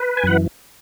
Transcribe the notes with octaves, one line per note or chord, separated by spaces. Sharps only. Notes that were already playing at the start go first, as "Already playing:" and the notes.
Already playing: B4
G#5
F#2 E3 F#5